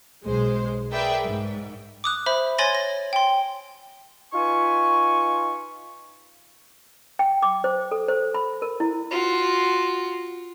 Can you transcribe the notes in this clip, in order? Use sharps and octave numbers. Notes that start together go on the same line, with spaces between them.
B1 G#3 C5
G#4 A#4 B4 D5 E5 G5
G#2
D6 D#6 F#6
C5 E5 B5
C#5 G#5 C6 A6 A#6 F#7
A#6
G5 C6
D#4 F4 B4 G#5 C#6
G5
D6
C5
A4
C5
B5
A#4
E4
F4 F#4